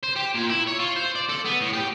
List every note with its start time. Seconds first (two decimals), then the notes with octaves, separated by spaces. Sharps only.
0.04 C5
0.16 G4
0.35 A#2
0.49 E4
0.67 C#5
0.79 F4
0.96 C5
1.15 D5
1.29 A4
1.45 B3
1.61 A2
1.73 G4